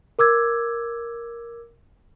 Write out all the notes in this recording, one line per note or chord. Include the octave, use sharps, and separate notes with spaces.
A#4 D6 E6 G#6